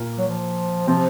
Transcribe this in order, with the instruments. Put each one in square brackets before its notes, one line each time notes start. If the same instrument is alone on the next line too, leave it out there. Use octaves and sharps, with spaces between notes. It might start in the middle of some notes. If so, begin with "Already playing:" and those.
Already playing: [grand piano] A#2 A#3
[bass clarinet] F#3
F3
[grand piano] C3 C4 [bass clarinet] F3